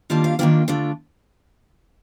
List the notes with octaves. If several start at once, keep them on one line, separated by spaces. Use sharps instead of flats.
D#3 G3 A#3 D4 F4 A5
F5
D#3 G3 A#3 D4 F4 G5
D3 A3 D4 F4